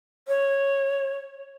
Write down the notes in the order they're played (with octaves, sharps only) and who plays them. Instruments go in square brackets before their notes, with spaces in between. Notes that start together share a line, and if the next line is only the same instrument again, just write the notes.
[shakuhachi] C#5